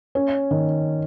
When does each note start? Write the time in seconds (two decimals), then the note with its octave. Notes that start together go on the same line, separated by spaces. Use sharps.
0.15 C#4
0.51 D#3